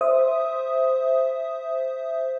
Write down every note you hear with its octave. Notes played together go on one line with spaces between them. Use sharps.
C5 E5 D#6